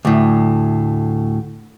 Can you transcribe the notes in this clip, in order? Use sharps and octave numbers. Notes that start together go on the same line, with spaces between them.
D2 A2